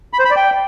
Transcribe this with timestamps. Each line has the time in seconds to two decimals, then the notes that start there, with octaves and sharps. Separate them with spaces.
0.13 B5
0.19 C5
0.25 B5
0.31 D5
0.36 G5